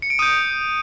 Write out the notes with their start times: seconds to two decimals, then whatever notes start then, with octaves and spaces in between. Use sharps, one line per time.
0.02 C#7
0.10 D7
0.19 D#6 G6 D#7